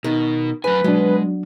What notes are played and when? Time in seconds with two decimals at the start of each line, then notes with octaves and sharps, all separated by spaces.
0.04 B2 D#3
0.64 D2 F#3 B4 G#5
0.84 B2 F#3 G#3 D4